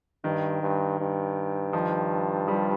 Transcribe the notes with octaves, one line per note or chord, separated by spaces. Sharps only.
G2 D#3
G2
G2
D#3 F3
F3 G3